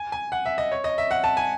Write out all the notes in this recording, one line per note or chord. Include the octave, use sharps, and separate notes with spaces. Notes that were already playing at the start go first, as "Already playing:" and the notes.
Already playing: G#5
G#5
F#5
E5
D#5
C#5
D#5
E5
F#5
A5
G#5